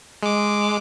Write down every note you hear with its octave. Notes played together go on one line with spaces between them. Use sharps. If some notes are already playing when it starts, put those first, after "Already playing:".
G#3 D6